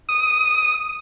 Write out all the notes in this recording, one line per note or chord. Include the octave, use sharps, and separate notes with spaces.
D#6